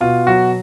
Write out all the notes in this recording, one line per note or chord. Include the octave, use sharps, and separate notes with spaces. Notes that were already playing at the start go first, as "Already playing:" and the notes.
B2 F4
F#3 F#4